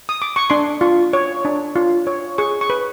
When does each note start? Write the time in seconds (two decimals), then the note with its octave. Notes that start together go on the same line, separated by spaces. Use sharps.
0.09 D#6
0.22 D6
0.36 C#6
0.50 D4 C6
0.81 F4
1.13 C#5
1.45 D4
1.76 F4
2.07 C#5
2.38 G#4 C#6
2.61 C#6
2.70 B4